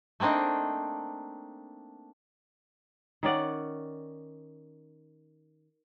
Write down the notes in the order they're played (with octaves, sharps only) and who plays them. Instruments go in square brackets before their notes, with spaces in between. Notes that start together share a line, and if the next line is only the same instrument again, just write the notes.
[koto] A3 A#3 C4 D4 D#4
[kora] D#3 C#4 D5 F#5